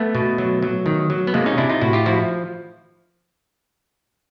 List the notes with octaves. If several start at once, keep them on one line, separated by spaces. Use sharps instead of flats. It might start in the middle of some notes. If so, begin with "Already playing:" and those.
Already playing: A3 B3
B2
F#3
F#3
D#3
F#3
B3
C3 G#3 A#3
C#4 D#4
C3 D4 E4
D#4 F4
A2 E4 F#4
F4 G4
F3 E4 F#4